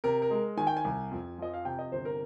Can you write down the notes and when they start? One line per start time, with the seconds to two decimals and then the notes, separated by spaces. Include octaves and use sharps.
0.04 C3 A#4
0.22 A#4
0.30 G#3
0.57 D#3 G#5
0.67 G5
0.77 G#5
0.84 C2
1.11 F2
1.38 F3 D#5
1.54 F5
1.65 C3 G5
1.79 D#5
1.92 G1 C5
2.05 A#4